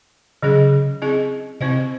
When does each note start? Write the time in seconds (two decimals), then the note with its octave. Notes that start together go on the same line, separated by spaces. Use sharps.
0.42 C#3 F#3 C#4 G#4 D#5
1.02 C4 E4 G#4 D#5
1.60 C3 C4 E4 C5 D#5